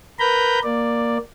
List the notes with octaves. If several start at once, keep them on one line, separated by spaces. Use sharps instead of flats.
A#4 B4 A#5 B5 G6
A#3 D5